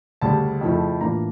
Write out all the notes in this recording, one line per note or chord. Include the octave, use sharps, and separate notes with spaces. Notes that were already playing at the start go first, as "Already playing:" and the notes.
D2 C#3 G3 A5
F2 C#3 F3 A3 E4
A2 E3 A#3 D4 F4 A#5